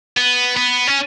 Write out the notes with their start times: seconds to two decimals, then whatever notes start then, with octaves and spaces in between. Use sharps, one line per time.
0.17 B3
0.57 B3
0.88 C#4